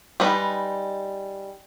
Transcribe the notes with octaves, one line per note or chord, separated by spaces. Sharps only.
G3 G#3 D#4 B4